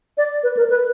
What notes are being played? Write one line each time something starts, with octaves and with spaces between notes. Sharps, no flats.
D5
B4
A#4
B4